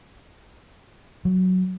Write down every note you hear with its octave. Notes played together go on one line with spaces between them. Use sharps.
F#3